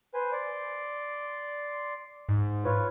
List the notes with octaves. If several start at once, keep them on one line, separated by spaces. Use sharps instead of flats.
B4 C5 G#5
D5 C6
G#2
F4 B4 C#5